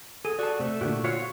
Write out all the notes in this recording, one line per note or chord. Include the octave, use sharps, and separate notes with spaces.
G#4 A4 D#7
F#4 D5 A5
C3 A3
A#2 D3 F#4 G4
F4 F#4 C#5 F5